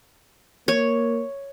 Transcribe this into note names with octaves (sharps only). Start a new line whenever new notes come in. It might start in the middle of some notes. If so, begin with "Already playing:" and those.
A#3 C#5